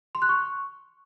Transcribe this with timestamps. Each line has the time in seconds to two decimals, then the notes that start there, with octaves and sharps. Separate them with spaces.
0.15 C6
0.22 F#6
0.29 C#6